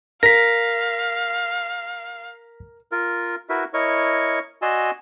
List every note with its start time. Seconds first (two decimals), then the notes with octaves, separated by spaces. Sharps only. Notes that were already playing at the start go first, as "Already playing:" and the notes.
0.23 A#4 F5 A#6 B6
2.92 F4 A#4
3.49 E4 F#4 A#4 B4 E5
3.73 E4 A#4 C#5 D#5 C#6
4.62 F#4 D5 D#5 G#5 C6 E6